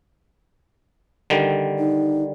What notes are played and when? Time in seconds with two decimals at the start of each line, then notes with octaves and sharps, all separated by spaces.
1.30 D3 D#3 G3
1.79 D#4